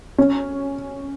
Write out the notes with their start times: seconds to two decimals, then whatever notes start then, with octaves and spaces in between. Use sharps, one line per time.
0.18 C#4